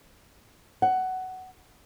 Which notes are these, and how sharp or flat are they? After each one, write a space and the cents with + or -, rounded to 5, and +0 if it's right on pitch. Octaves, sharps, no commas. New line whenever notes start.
F#5 +15